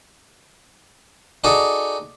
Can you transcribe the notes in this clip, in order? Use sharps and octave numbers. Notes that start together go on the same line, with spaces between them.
D#4 F#4 G#4 A4 D5 D#5